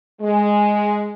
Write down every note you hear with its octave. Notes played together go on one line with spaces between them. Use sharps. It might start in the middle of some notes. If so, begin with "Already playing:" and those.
G#3